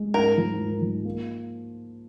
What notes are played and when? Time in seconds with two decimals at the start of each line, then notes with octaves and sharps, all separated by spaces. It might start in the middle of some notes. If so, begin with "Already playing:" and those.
Already playing: G#3
0.14 G#2 A#4
0.38 F3
0.59 G#2
0.82 F3
1.05 A#3